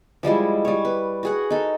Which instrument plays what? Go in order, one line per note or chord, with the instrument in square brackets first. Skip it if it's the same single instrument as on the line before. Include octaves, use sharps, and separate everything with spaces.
[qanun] F3 G3 G#3 E4
G3 C#5
B4
F#4 G#4 F#5
D#4 A4